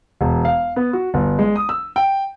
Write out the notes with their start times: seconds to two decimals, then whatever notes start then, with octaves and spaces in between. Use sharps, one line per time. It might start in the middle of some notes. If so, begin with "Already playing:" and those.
0.21 E1
0.45 F5
0.76 B3
0.93 F#4
1.14 G1
1.39 G#3
1.56 D#6
1.69 E6
1.96 G5